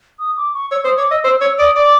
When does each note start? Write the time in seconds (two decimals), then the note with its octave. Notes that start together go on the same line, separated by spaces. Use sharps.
0.19 D#6
0.37 D6
0.54 C#6
0.71 C#5 E6
0.84 C5 D#6
0.97 C#5 D6
1.10 D#5 E6
1.24 C5 E6
1.41 C#5 E6
1.59 D5 D#6
1.76 D5 D6